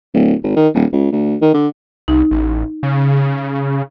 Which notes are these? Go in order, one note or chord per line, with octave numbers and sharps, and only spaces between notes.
D1
G#1
D#3
D#1
C#2
D2
D#3
D3
C2 D#4
A1
C#3